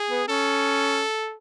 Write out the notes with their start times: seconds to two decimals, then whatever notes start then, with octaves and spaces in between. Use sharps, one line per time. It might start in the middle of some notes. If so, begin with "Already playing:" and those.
Already playing: G#4
0.10 B3
0.28 C#4 A4